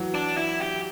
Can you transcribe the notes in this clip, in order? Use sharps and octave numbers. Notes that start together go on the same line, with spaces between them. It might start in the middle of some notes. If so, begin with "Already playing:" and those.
Already playing: E3 F#3
D4
E4
G4